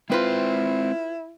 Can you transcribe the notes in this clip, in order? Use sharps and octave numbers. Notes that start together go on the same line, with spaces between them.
G#3 C4 E4 F4 B4 C5 G5